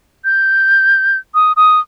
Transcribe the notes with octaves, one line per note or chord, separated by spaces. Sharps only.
G6
D#6
D#6